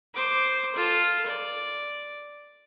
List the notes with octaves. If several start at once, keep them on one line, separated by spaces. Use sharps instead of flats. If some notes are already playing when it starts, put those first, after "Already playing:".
C5 D6
F4 A4
D5